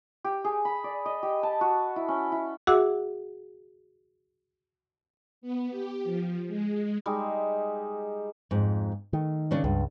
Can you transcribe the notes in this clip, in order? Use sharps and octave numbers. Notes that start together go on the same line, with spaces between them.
G4
G#4
B5
D5
D#5
G4
A5
F#4
E4
C#4
E4
F#4 G#4 E5 F#5 D6 E6
B3
G4
F3
G#3
G3 G#3 D#4
F2 G#2
D#3 A3
C#3 C#4 D4
C#2 G2